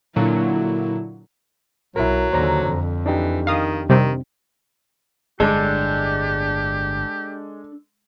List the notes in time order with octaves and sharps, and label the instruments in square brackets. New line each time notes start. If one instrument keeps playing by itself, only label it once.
[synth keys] A#2 D3 F#3 [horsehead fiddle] E4
[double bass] B1 [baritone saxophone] F#3 [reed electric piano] E4 A#4
[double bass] D#2 D3 [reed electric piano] C5 D5 A#5
[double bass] F2
[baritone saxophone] E3 [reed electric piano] D4 D#4 G4
[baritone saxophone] D#3 [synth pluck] F5 D#6
[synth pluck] C3 G3 C4 [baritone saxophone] D#3
[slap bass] G1 A2 [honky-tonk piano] G#3 [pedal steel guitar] D4 A4 [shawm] G4